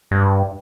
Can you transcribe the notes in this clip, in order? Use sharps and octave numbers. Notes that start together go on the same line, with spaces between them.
G2